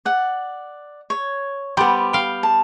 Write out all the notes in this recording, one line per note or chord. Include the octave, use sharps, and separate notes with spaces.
D5 F#5
C#5
G3 B3 G4 C5
F5 G5
A5